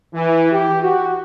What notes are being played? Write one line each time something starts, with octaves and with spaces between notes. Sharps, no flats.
E3
G4
F#4